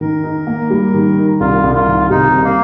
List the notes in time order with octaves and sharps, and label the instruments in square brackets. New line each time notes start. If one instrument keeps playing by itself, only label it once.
[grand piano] D#3 [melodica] A#4
[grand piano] D#4
A#3
G3
D#3
D#4
[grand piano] C2 [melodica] F4
[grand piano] C2
[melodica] F4
[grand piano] D#3
[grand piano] C3 [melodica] D#4
[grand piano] C2
[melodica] A#3